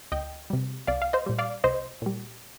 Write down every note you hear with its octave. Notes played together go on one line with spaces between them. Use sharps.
D2 D#5 G5
C3 G3
C2 D5 F5
F5
C5 D#5
A#2 G3
D5 F5
C2 C5 D#5
A#2 G3